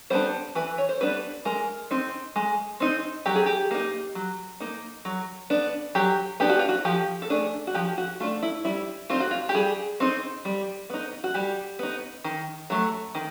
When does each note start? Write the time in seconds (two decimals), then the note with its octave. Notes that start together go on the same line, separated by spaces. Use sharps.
0.10 G3 B3 D4 C5
0.55 E3 B4
0.78 C#5
0.89 C5
1.00 G3 B3 D4 B4
1.45 G#3 A#4
1.91 C4 D#4
2.36 G#3
2.80 C4 D#4
3.26 F#3 G4
3.35 G#4
3.46 G4
3.71 A#3 D#4
4.15 F#3
4.60 A#3 D#4
5.05 F#3
5.50 B3 D4
5.95 F#3 G4
6.40 B3 D4 G4
6.49 F#4
6.59 F4
6.69 F#4
6.85 F3 G4
7.22 A4
7.30 A3 D4 G#4
7.67 F#4
7.74 F3 G4
7.98 F#4
8.20 A3 F4
8.23 D4
8.42 E4
8.65 G3 E4
9.10 C4 D#4 F4
9.20 F#4
9.31 F4
9.49 G4
9.54 G3 G#4
10.00 C4 D#4
10.45 G3
10.90 B3 D#4
11.24 F#4
11.34 G3 G4
11.79 B3 D#4
12.24 D#3
12.70 F#3 A3
13.15 D#3